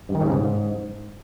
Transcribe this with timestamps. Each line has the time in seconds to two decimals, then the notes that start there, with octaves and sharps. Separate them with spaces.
0.09 G2
0.15 D#3
0.21 G#2
0.26 C#3
0.32 G#2